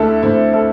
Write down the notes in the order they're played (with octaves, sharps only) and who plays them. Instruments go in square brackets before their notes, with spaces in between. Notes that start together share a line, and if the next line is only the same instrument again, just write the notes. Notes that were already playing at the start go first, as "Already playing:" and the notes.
Already playing: [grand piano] D2 D3 E4 A4
D2 D3 C4 E4
E4 A4